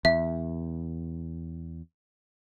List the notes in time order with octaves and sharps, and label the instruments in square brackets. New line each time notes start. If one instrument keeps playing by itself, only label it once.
[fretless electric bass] E2 [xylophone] E5